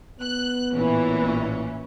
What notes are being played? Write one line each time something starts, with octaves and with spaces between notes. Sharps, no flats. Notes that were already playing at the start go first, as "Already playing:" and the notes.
B3 F#6
A1 A#2 E3 C#4